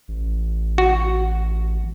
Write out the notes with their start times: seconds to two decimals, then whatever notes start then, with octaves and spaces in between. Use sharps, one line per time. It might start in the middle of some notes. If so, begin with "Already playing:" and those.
0.08 A1
0.78 F#4